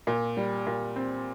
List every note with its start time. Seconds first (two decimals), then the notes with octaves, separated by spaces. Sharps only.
0.07 A#2
0.37 G3
0.67 A#2
0.96 C4